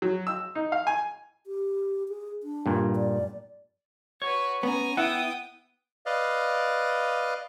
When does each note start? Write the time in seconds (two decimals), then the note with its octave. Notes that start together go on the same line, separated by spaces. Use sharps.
0.02 F#3
0.27 E6
0.55 D#4
0.72 F5
0.87 G#5
1.47 G4
2.09 G#4
2.43 D4
2.66 G2 A#2
2.96 D5
4.22 F#4 B4 C#5
4.63 B3 C#4 G#5 A#5
4.97 B3 E4 F#5 G5 D#6
6.06 B4 D5 D#5 F5